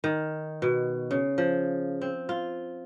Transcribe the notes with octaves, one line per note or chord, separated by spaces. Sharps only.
D#3
B2
C#3
F3
C4
F4